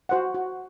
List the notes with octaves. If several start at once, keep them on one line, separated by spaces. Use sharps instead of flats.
F#4 C5 F#5
F#4